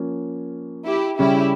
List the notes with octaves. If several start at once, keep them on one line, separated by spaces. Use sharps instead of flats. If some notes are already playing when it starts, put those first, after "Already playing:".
Already playing: F3 A#3 C#4
E4 G4
C#3 G3 C#4 E4 G4